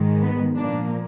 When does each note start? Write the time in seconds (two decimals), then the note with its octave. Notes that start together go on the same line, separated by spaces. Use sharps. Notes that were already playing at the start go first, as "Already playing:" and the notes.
Already playing: G#2 D#3 G#3
0.22 B3
0.55 A#2 F3 A#3 D4